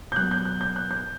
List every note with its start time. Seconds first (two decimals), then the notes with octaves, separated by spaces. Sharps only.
0.12 G6
0.16 B2 F#3 F#6
0.31 G6
0.45 F#6
0.61 G6
0.76 F#6
0.91 G6